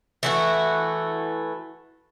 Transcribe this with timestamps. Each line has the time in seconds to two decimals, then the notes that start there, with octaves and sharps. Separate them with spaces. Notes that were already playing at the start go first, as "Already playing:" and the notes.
0.23 E3 A3 F#4